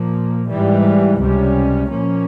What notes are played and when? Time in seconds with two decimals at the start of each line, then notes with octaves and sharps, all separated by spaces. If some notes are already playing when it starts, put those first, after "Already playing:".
Already playing: A#2 F3 A#3
0.48 G#2 E3 G3
1.18 C#2 C3 G3 C#4
1.90 A#2 F3 A#3 C#4